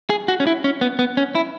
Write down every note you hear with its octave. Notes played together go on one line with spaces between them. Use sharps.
G#4
F#4
C#4
E4
C#4
B3
B3
C#4
E4